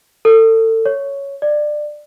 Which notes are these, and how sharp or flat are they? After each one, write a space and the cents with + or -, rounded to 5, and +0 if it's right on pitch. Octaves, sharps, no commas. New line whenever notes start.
A4 +30
C#5 +5
D5 +20